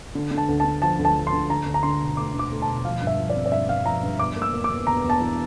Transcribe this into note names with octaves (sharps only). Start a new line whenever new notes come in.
D3
D3
A5
D2
A5
D3
F3 A5
D2
A5
F3
C6
D2
D3 A#5
D2
A#5
D3 C6
E1
A3 D6
D2
D6
A3
A5
E1
F3 F5
G2
E5
F3
D5
C4
D5
G2 E5
G2 F5
F3 A#5
G2
E2 D6
A#3
E6
A#3
D6
E2
E2 A#5
E2
A5
E3